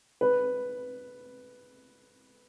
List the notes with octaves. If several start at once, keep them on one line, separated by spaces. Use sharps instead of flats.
B4